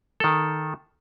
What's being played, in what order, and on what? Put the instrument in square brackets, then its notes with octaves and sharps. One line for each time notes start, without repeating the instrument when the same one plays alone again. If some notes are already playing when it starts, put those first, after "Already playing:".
[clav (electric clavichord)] D#3 A4